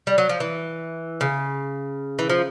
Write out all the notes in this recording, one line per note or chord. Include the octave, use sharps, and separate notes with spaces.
G3
F#3
F3
E3
C#3
E3
F3